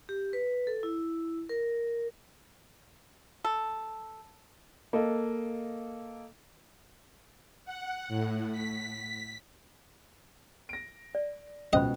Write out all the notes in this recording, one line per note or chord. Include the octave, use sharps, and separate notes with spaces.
G4
B4
A4
E4
A#4
A4
A#3 A4 D#5
F#5
A2
B6
A#6 D7
D5
C#2 B2 C#4 C5 D#5 B5